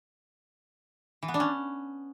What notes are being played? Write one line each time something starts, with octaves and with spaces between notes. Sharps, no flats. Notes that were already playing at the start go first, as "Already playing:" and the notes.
E3
B3
D4
C#4